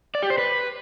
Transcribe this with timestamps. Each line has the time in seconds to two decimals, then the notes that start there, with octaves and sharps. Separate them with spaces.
0.15 D5
0.23 G4
0.30 C5
0.38 B4